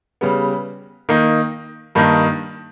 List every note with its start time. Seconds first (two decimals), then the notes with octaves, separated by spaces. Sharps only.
0.21 C#3 G3 B3
1.09 D#3 A#3 D#4
1.95 G2 D#3 A#3 D#4